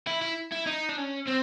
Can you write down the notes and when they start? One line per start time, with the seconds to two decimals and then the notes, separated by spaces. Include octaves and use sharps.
0.07 E4
0.22 E4
0.52 E4
0.67 D#4
0.89 D4
0.98 C#4
1.27 C4